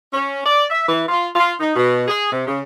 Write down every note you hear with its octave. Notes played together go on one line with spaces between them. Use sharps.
C#4
D5
E5
E3
F4
F4
D#4
B2
G#4
C3
C#3